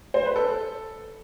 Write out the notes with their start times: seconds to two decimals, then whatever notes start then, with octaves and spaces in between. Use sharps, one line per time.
0.14 C5
0.25 B4
0.36 A4